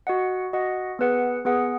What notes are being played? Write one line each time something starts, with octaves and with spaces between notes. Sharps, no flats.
F#4 D#5 F#5
F#4 D#5 F#5
B3 G#4 B4 F#5
B3 G#4 B4 F#5